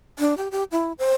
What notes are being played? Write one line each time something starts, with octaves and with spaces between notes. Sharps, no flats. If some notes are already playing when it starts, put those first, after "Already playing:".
D4
G4
G4
E4
C5